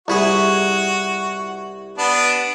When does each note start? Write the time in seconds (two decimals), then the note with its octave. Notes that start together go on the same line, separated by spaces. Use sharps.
0.08 C2 E4 F#4 G#4
1.98 B3 D4